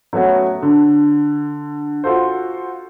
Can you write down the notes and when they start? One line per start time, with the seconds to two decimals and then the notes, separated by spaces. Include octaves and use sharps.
0.13 F#3 A3 B3 C#4 F#4
0.62 D3
2.04 F4 F#4 A4 C5